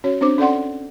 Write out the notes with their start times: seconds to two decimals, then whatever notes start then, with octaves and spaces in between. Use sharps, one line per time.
0.04 C#4 F#4 C#5
0.21 C4 D4 C5 D6
0.38 C#4 A4 D5 F#5 C6